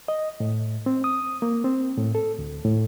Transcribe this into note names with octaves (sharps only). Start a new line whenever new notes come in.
D#5
A2
C4
D#6
A#3
C4
A2
A4
D2
A2